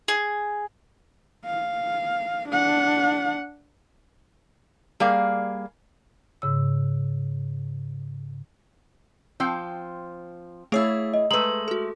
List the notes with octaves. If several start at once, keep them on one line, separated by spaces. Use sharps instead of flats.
G#4
F5
D4 F#5
G3 A#3 G#4 D5 F5
G#2 C#3 E6
F3 C4 G5
A3 E4 G#4 C#5 E6
D#5
G#3 A3 B4 A#5 F#7
F#4 A4